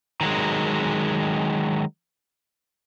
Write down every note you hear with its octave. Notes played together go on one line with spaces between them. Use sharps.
D#3 F#3 G#3